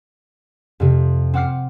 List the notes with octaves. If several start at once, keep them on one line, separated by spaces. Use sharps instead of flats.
F2 C3
C4 F#5 D6 F6 C7